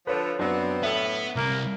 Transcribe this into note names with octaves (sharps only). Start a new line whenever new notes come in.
D3 F3 B4 C#5
F#2 B3 C4 D4 A#6
A2 B3 E5
C2 A#3